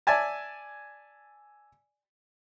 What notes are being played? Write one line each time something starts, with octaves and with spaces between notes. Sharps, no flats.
D5 E5 G#5 A5